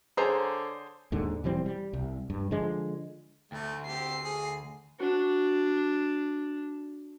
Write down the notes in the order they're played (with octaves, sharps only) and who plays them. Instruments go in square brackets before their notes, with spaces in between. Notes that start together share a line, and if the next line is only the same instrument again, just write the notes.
[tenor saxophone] D3 [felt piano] G#4 C5 [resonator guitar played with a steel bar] C#5 A#5
[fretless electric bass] D#2 G#2 D3
E1 E3 G3 C4
G3
C2
G2
D3 F3 G#3
[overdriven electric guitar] D2 [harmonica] A3
[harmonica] C4 G4 [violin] C7
[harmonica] G#4
[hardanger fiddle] D4 [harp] F#4